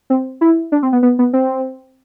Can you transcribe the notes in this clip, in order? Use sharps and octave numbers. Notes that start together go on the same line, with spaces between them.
C4
E4
D4
C4
B3
B3
B3
C4